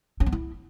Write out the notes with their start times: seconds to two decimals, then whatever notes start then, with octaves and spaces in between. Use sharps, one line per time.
0.20 C#4
0.26 B3
0.32 E4